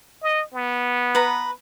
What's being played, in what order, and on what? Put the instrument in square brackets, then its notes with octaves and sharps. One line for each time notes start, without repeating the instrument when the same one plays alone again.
[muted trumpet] D#5
B3
[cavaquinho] B4 A#5